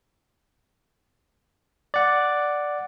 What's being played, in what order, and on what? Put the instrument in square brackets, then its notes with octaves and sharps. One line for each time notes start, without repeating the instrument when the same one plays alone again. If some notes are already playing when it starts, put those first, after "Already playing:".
[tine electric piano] D5 F#5